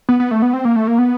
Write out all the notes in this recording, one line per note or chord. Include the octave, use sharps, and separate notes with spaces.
B3
B3
A3
B3
C4
A#3
A3
A#3
B3